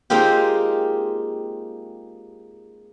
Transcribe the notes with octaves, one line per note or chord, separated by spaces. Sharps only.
G#3 A#3 C4 D#4 F4 G4